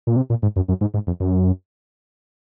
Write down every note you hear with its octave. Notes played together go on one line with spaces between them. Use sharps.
A#2
C3
A#2
G#2
F#2
F#2
G#2
G#2
F2
F#2